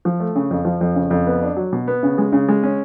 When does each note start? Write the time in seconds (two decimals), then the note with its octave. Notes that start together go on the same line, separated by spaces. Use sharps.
0.05 F3
0.20 A3
0.35 C#3
0.51 F2
0.65 F3
0.81 F2
0.95 C#3
1.10 F2
1.27 B3
1.42 D4
1.56 F#3
1.73 B2
1.88 B3
2.03 C#3
2.18 G#3
2.32 C#3
2.48 G#3
2.63 C#4